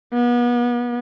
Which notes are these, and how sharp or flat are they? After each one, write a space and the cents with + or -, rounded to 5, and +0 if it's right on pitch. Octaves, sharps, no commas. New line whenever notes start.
B3 -35